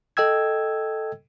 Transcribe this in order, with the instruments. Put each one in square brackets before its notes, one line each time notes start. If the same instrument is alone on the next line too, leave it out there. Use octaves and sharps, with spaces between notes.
[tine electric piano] A4 D#5 G5 E6 G#6